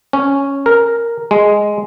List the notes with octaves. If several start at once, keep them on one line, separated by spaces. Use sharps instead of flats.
C#4
A#4
G#3